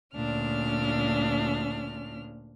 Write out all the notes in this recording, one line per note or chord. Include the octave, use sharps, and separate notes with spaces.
D2 A#2 C#4 D4 F6